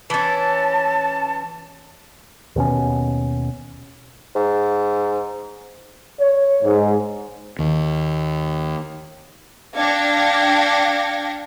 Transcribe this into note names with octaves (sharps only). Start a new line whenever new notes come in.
E3 C#4 A5
D#2 B2 C#4
G#2
C#5
G#2
D#2
D4 F5 G5 G#6 A#6 C#7